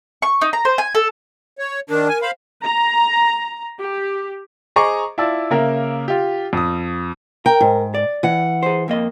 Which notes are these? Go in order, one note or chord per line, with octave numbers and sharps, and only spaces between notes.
C#6
D#4
A#5
C5
G#5
A4
C#5
D#3 D4 A#4
G#5
C5 F5 B5
A#5
G4
G#4 C5 D#5 A#5 C#6 D6
E4 F4 D5 A5 E6
C#3 A#3 A#4 E5
F4 G4
F2 D#6
A#4 G5
G#2
D5
E3 F#5
G#4 C5
F2 A#3 D#5